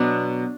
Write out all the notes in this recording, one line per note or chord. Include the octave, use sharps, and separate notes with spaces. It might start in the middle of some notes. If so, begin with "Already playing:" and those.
Already playing: B2 F#3 B3 D4